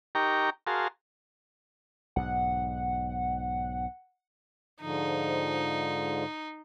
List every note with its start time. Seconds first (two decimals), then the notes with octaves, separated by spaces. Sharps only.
0.15 D#4 G4 A#4 G5 A#5 C#6
0.67 F#4 G#4 A#4 F5 A5 C6
2.16 B1 G#2 F#5
4.81 G#2 D3 F3 D#4